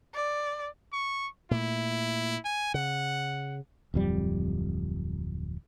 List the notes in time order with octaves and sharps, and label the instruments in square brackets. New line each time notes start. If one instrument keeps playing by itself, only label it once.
[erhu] D5
[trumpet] C#6
[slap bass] A#2 A3 [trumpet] E4
[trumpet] G#5
[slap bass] C#3 [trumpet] F#5
[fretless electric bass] D1 F2 G3